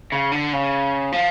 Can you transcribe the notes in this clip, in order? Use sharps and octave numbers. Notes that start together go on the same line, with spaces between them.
C#3
D3
C#3
F3